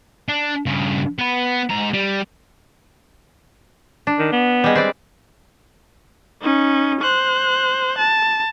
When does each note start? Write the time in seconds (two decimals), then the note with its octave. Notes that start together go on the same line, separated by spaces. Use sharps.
0.29 D4
0.66 G2 C#3
1.19 B3 B4
1.70 G#2 A#5
1.93 G3
4.07 D4
4.19 D#3
4.32 B3
4.64 G3 G#3
4.75 C4 B4 D5
6.41 C#4 D#4
7.01 C5 F#6
7.98 A5